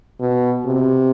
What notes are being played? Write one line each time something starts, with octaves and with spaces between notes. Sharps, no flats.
B2
C3